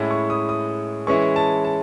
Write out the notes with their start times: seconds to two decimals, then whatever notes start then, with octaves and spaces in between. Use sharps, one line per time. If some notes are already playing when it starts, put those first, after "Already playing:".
Already playing: A2 G#3 C#4 E4
0.11 C#6
0.30 D#6
0.49 D#6
1.07 E3 G#3 C#4 E4 C#6
1.36 A5
1.64 A5